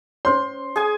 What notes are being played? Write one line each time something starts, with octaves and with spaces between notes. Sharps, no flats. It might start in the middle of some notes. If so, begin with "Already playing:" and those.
C#4 C5 C#5 C6
G#4 G#5